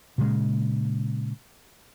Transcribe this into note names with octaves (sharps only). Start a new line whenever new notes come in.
A#2 C#3 G#3